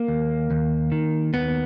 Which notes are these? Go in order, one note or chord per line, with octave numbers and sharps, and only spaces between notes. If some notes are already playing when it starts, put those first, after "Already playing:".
Already playing: A#3
D#2
D#2
D#3
D#2 B3